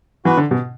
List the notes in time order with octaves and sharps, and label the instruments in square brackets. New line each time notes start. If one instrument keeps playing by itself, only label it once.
[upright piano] E3 [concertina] B3 F#4 B4
[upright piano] D3
B2